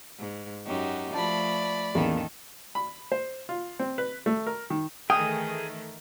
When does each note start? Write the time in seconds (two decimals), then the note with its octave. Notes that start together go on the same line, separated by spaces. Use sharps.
0.19 G#2
0.66 F#2 D#4 F#4 G4
1.14 F3 A3 D5 A5 B5
1.95 A1 E2 D#3 A#3 A4
2.75 B5
3.12 C5
3.49 F4
3.80 C4
3.98 B4
4.26 A3
4.47 A#4
4.70 D#3
5.10 D#3 E3 A3 G#4 G5 D#6 F6